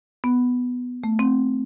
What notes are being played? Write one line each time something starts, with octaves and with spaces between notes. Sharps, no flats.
B3
A3
C4